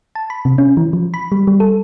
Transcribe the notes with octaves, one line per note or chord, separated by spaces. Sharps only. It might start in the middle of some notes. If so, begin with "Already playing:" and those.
A5
B5
C3
C#4
E3
F3
B5
G3
G3
A4